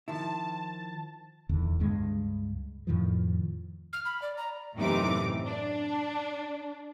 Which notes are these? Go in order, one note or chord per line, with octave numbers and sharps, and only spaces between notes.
D#3 F3 E4 A5
D#1 E2 D3 D#3
C#2 G2 G#3
F2 A2 D#3 F3
F6
B5
D5
A#5
F#2 A2 C3 E3 D#4 D6
D4